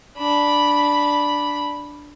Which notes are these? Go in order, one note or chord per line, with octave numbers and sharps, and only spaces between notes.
D4 B5